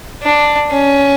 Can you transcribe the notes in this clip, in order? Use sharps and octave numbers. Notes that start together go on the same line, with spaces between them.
D4
C#4